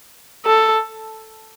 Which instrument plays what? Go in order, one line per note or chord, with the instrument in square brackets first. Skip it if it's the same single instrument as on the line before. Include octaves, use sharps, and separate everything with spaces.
[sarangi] A4